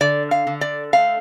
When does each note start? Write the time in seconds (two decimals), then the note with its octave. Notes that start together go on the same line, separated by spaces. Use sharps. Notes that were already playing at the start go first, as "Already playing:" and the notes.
0.01 D3 D5
0.31 F5
0.47 D3
0.61 D5
0.93 A3 F5